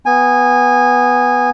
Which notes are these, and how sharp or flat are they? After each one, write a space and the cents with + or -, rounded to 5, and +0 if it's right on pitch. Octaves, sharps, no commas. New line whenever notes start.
B3 +0 G#5 -15